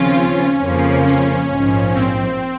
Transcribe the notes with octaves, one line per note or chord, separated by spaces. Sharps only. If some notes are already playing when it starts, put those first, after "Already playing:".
Already playing: D#2 C#3 F3 C4 C#4 F4
F2 C#3 F3 A#3
C#4
A#1 G#2 F3
C4